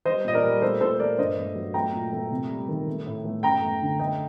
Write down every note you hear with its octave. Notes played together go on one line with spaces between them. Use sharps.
G3 C5 D#5
A#2 D#5
A#4 D5
G3
A3 A4 C5
A#2 A4 C5
A3 A#4 D5
G2 C5 D#5
A3
F#3
A3 G5 A#5
A#2
A3
C3
G3
D#3
A3
A2
A3
F#2 G5 A#5
A3
D3
A3 D#5 G5